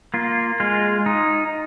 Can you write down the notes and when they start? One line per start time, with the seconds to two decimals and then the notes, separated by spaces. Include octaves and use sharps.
0.14 A#3 F4
0.60 G#3 F4
1.06 D#4